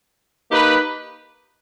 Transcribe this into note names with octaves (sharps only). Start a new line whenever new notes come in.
A#3 D#4 G4 B4